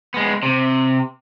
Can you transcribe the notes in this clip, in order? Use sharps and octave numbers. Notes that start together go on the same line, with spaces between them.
G#3 B3
C3